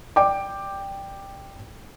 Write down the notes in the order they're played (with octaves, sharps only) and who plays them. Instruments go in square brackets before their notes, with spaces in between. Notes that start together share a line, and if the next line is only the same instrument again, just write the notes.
[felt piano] D5 G5 D6